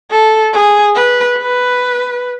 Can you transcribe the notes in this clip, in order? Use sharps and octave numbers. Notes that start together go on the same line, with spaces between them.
A4
G#4
B4
B4